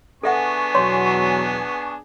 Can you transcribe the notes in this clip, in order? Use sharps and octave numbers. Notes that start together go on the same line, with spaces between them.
B3 D4 G#4 A4 E5 F#5 G#5 C#6
E2 B2 F#3 C#5 C6